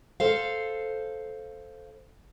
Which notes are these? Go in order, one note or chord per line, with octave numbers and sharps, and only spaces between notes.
A4 C5 F5